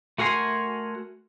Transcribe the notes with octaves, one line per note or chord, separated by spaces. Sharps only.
A3 F#4 A#4 G#5 C6